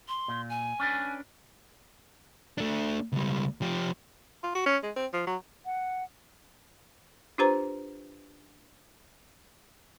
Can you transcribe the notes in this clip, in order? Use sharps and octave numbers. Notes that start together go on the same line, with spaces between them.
C6
A#2
G#5
C#4 D4 B4
A3 D4
C#2 G3
F3 G4
F4
F#4
C#4
G#3
C4
F3
F#3
F#5
D4 F4 G4 B4 C5 A#5